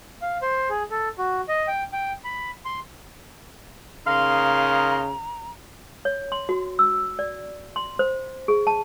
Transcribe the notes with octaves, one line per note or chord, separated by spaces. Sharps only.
F5
C5
G#4
A4
F#4
D#5
G5
G5
B5
C6
C#3 A#3 D#4 F5 A#5 C6
C#5
C6
F#4
E6
D5
C6
C5
G#4
A5